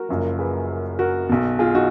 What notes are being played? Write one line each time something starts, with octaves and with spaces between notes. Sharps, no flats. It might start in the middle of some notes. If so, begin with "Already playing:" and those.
Already playing: F#4 A#4
F#1 F#2 F3
G#4 B4
F#4 A#4
B1 B2
F4 G#4
D#4 F#4